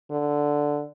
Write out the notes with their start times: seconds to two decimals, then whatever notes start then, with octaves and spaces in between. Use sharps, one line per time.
0.11 D3